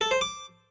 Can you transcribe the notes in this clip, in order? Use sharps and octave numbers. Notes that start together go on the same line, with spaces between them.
A4
C5
D6